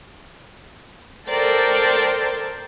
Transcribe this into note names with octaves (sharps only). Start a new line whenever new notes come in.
A4 A#4 C5 D5 G5